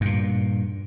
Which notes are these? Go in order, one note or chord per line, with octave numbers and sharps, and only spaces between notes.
G2 A#2